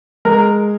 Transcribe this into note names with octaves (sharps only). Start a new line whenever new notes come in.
G#3 A#4